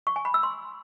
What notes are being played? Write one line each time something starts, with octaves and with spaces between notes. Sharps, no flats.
C#6
G#5
B5
E6
C6